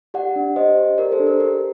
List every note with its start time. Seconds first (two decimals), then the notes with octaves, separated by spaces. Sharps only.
0.14 G4 D5 F#5
0.36 D4
0.56 G4 C5 D#5
0.77 G4
0.98 G4 A#4 D5
1.12 A4 C5
1.19 D4
1.27 A#4
1.40 G4 A#4